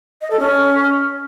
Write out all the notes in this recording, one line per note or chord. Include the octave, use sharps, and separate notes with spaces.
D#5
A4
C#4